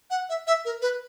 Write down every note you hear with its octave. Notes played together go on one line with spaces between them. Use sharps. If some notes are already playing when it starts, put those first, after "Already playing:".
F#5
E5
E5
A#4
B4